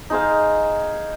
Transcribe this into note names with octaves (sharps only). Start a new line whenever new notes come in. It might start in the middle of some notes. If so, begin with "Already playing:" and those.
D#4 G#4 C5 F5